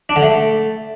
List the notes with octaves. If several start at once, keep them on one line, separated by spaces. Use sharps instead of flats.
D4
D3
A3